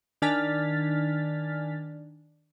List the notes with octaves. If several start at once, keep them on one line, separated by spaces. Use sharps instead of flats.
D#3 D4 G#5 F6 A6 B6